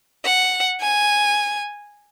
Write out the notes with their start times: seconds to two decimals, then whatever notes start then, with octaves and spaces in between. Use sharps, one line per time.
0.25 F#5
0.81 G#5